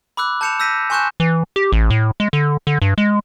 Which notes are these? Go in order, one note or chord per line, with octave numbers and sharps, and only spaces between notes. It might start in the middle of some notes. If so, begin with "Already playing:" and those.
B5 D6 E6 F#6
A5 G6 C#7 E7 F7
E6 G6 A#6 B6 D#7
G#5 C6 C#6 F#6 G6 E7
E3
G4
A1
A2
G#3
D3
D3
G2
G#3